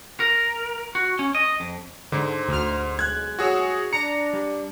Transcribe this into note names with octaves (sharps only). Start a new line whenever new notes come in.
A#4
F#4
C#4
D#5
F2
G#2 D3 C5
D2 F6
B1 G#3 F#6 G#6
F#4 G#4 C#5 E6
D4 A#5 C#7
G3